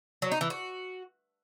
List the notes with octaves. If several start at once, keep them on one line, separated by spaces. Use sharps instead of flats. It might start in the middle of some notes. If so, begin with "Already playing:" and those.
F#3
D#4
E3
F#4